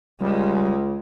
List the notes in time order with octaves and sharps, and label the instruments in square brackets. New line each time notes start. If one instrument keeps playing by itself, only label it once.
[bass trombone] C#2 [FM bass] G3 [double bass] G#3